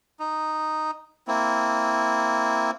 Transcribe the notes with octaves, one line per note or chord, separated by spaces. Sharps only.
D#4
A#3 C4 E4